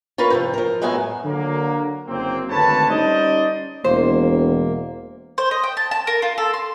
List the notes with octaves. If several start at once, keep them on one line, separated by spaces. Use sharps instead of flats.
F4 A#4 B4 C#5
A2 C3 F3
F3 A#4
A2 F#3 G#3 B3 E5 G#5
D3 F#3 A#3
F#1 A#3 C4
G#1 D2 D3 B4 C#5 A5
G3 C#4 D#4 C5 D5 D#5
E1 A#3 C5
C5
D#5
G5
A5
A5
A#4
F4
A4
C6